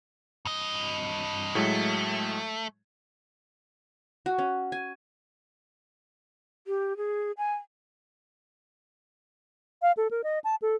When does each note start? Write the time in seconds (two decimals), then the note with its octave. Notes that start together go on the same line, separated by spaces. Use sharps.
0.45 G2 D#5
1.55 A2 F#3 G#3 A3
4.26 F#4
4.38 C#4
4.72 G#5
6.67 G4
6.97 G#4
7.38 G#5
9.82 F5
9.97 A4
10.11 A#4
10.24 D#5
10.44 A5
10.62 A4